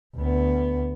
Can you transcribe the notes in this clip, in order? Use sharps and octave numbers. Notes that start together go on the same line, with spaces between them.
D2 B3